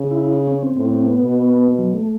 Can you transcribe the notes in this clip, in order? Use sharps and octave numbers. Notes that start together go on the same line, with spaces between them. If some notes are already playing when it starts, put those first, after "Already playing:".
Already playing: C#3
E4
C#4
C4
A2 C4
C4
B3
B2
F#3
A3